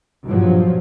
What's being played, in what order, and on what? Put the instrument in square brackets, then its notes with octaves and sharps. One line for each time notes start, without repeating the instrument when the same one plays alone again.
[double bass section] G2 A#2 F3 F#3